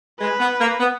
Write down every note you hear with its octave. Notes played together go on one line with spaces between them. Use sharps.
G#3 B4
B3
A#3
B3